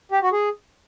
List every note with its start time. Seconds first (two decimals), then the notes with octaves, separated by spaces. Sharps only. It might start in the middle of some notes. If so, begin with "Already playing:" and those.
0.12 G4
0.22 F#4
0.32 G#4